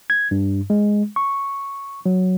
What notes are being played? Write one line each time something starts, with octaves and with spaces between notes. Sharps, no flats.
G#6
G2
G#3
C#6
F#3